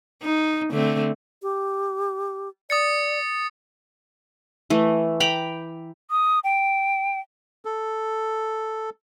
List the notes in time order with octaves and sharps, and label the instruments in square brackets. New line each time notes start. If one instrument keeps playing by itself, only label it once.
[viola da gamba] D#4
D3 A3 C4
[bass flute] G4
[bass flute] D5 [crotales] D#6 A6 C#7
[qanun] E3 A3
G5 A#5 B5 D6
[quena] D#6
G5
[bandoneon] A4